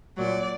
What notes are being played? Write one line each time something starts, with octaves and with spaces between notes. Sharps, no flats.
A#2 F#3 D5